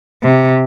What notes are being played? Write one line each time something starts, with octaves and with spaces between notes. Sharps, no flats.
C3